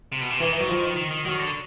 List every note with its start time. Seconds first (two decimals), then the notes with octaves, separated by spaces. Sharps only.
0.12 C3
0.21 B2
0.30 C3
0.40 D#3 E3
0.60 F#3
0.69 F3
0.96 D#3
1.11 D#3
1.25 D#3 F#3
1.39 D3